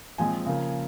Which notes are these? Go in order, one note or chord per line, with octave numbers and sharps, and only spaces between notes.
A#2 F3 G#3 C4 G#5
C#3 F3 A#3